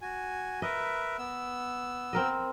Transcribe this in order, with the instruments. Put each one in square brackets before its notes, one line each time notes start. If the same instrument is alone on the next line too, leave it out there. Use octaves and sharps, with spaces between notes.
[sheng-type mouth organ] F#4 G#5
[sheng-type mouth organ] A#4 B4 E5 [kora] D#5
[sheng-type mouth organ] B3 E6
[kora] C4 A#4 D#5